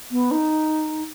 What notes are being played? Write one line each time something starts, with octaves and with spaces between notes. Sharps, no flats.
B3
D#4